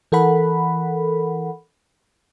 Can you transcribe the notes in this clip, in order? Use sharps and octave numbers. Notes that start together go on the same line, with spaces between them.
E3 A4 A#4 F#5 B5